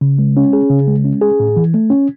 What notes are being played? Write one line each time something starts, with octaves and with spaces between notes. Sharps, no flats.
C#3
G#3
C#4
G#4
C#3
G#3
C#4
G#4
A2
E3
A3
C#4